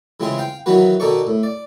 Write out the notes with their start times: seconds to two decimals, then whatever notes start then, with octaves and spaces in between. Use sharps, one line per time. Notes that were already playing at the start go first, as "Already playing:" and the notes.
0.20 C#3 E3 G#3 C4 F4 G#4
0.38 F5 G5
0.66 D#3 E3 F#3 B3 F#4 B4
1.00 B2 D#3 D#4 A4 D5 C#6
1.27 A2
1.43 D5